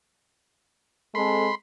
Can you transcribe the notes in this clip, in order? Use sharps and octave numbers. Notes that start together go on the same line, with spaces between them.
G#3 C4 A4 B5 C6